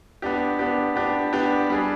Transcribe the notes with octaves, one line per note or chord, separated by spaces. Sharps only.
B3 D4 G4
B3 D4 G4
B3 D4 G4
B3 D4 G4
G3 D4 G#4